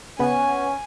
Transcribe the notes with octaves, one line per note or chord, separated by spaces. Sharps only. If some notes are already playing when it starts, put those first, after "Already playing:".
C#3 B3 C#4 B4 F#5 G#5